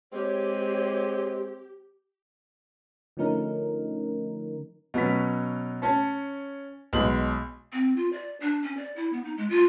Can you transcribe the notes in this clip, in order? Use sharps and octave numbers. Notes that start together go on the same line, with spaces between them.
G#3 C4 G4 C#5
D3 F3 A3 C#4 D#4 A#4
B2 F#3 C#4 B6
C#4 C#5 A5
B1 G#3 F#7
C4
F4
D5
D4
C#4
D5
E4
B3
D#4
G#3
F4